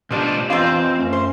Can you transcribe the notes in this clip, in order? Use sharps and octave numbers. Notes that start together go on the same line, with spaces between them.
B2 F3 G3 D4 D5
F2 E3 C4 F4 D#5
F#2 A3 C#4
C5